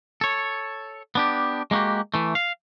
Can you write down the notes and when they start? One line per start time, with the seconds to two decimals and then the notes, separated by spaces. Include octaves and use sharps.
0.21 A4 C#5
1.15 B3 D4 G4
1.71 G#3 A#3 D#4 F#4 G4
2.14 E3 A3
2.35 F5